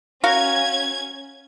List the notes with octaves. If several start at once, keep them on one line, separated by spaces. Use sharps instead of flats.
C#4 F#4 A#4 F5 G#6